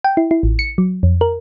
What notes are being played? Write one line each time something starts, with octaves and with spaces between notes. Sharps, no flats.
G5
E4
E4
A1
C#7
F#3
F2
A#4